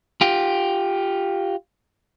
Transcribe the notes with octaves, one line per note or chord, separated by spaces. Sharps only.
F4 G4